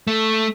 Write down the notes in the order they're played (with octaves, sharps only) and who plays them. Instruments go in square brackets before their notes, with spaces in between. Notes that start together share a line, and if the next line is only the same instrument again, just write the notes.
[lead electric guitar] A3